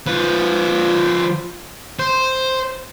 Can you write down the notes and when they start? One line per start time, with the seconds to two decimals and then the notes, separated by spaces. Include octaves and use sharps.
0.06 F3 B4
1.99 C5